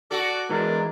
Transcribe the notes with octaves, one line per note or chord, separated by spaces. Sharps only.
F#4 A4 D5
E3 G#3 D4 A#4